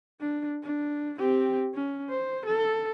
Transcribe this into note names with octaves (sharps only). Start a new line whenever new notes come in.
D4
D4
C4 G4
C#4
C5
A4